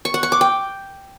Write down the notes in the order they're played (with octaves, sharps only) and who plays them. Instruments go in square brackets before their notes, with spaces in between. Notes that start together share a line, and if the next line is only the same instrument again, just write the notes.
[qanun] C#6
F#5
C#6
D6
G5